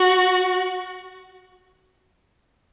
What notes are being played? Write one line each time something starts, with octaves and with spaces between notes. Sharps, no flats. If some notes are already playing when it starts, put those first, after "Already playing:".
Already playing: F#4